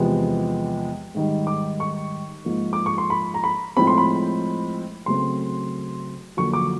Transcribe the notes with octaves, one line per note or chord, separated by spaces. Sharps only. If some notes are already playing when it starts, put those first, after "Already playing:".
Already playing: E2 C3 F3 G#3 B3
G#2 D#3 G3
D6
C#6
G#2 F3 A#3
D6
C#6
C6
B5
A#5
B5
A2 F3 G#3 C4 B5
C6
B5
C#3 F#3 A3 C4 C6
F2 D3 F#3 A#3 C#6
D6